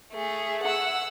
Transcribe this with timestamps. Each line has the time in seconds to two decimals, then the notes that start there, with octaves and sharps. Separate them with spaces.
0.13 A3 G#4
0.63 F#5 E6